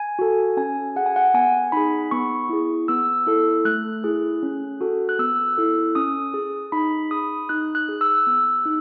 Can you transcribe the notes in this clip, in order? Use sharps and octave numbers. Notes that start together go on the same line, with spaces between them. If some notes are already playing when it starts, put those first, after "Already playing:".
Already playing: G#5
F#4 A4
C#4 G#5
G#4 F#5
G#5
F#5
B3 G#5
D#4 G#4 B5
B3 C#6
E4 G#4
B3 E6
E4 A4
A3 F#6
E4 G#4
C#4
F#4 A4
F#6
B3 E6
E4 A4
C#4 D#6
G#4
D#4 B5
G#4 D#6
D#4 F#6
F#6
G#4
E6
B3
D#4